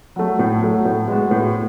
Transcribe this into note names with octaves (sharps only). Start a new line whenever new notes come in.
F#3 A3
A2
F#3 A3
A2
G#3 B3 F#4
A2